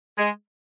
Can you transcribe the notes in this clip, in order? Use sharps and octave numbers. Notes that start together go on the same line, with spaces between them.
G#3